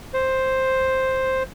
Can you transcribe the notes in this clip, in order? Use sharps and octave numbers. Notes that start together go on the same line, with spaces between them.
C5